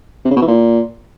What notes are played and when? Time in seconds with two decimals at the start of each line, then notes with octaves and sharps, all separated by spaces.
0.25 C3
0.31 C#3
0.36 B2
0.42 E3
0.48 A#2